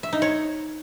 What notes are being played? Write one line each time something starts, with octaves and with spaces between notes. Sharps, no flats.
E5
D#4
C#5